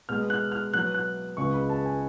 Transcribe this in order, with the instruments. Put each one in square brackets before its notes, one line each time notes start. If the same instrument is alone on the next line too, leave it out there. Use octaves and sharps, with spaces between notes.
[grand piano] B2 G#3 B3 F6
F#6
F6
B2 F#3 B3 F#6
F#6
C#2 C#3 G#3 B3 C#6
B5
A5
G#5